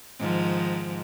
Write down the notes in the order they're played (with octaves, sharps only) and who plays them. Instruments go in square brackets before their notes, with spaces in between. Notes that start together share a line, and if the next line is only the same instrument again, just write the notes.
[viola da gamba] G#2 D#3 F3